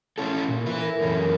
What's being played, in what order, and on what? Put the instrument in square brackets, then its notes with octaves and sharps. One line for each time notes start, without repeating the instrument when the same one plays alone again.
[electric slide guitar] C#4 E4 A4
A#2
E4 B4 E5
[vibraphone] A4 A#4
[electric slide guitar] F#2 E3 C#4